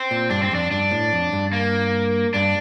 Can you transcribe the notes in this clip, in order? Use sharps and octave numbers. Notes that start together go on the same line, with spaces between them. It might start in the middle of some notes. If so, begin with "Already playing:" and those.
Already playing: C4
A#2
G2 D4
C4
F2 D4
G2 D4
A2
F2
G2
A#3
G2 D4